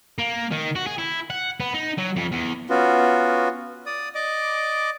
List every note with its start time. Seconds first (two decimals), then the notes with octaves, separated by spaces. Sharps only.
0.18 A#3
0.52 D#3
0.76 F#4
0.87 G#4
0.99 E4
1.30 F#5
1.60 B3
1.74 D#4
1.98 F#3
2.16 F2
2.32 E2
2.69 B3 C#4 F4 F#4
3.86 D5 D#6
4.15 D5 D#5 D6